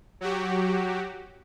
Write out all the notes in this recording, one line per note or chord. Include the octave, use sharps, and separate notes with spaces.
F#3 F#4 G4